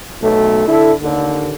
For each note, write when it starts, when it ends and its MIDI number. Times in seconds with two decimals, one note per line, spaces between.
0.23 0.65 35
0.23 0.65 57
0.68 0.93 50
0.68 0.93 64
0.68 0.93 69
1.02 1.55 39
1.02 1.55 50